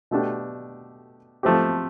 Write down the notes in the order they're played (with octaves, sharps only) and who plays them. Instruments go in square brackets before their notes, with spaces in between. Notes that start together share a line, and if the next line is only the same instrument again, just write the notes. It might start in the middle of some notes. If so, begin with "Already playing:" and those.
[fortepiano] B2 A3 D4 G4
F3 A3 C4 G4